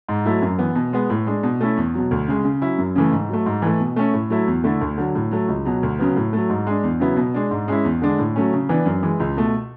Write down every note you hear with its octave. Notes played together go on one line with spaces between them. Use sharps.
G#2
F#3 A3 E4
F#2
E3 B3
B2
G#3 B3
A2
G#3 D4
B2
A3 C#4 E4
E2
B2 F#3
D2
C#3 G#3
C#3
F#3 C#4 E4
F#2
C#3 E3 A3
G#2
F#3 A3
G#2
E3 A3
B2
A3 C#4
A2
F#3 A3 E4
E2
D3 A3 E4
D2
D3 F#3
A2
F#3 A3
C#2
B2 F#3
D2
C#3 F#3 B3
A2
F#3 A3
G#2
G#3 D4
E2
C#3 F#3 B3 E4
B2
G#3 D4
G#2
G#3 C#4 E4
E2
D3 G#3 D4
A2
F#3 A3 C#4
C#3
E3 B3 D4
F#2
E3 G#3
C#2
B2 A3